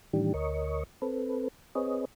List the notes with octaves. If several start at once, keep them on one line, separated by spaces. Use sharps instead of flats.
A2 D#3 E3 G3 D4 G4
D2 A#4 C#5 D#5 C#6
C4 A4 B4
C4 G#4 B4 C#5 D#5